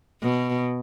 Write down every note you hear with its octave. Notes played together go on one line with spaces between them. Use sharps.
B2